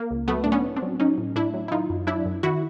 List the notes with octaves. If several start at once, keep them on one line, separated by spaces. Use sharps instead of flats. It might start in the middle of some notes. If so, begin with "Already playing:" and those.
Already playing: A#3
C#2
F#3 A3 B3
A2 D4
B3 C#4
A2
C4 D4
F#3
F#3 C#4 D#4
A2
A2 D4 E4
F#3
E4
D#3 D#4 F4
F#2
F#3 D4 E4
F#2
D#3 E4 F#4